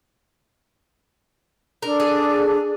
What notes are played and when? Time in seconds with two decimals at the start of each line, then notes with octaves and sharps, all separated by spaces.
1.82 D4 A4 A#4
2.00 G#4